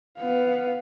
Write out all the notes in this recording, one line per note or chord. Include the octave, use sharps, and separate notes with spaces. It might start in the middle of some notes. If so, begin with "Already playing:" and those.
B3 F5